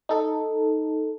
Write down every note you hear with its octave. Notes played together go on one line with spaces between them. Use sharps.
D#4 A4